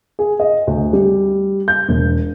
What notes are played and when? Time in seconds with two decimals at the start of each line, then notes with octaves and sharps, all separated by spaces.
0.19 G#4
0.40 D#5
0.67 D2
0.93 G3
1.68 G6
1.88 E1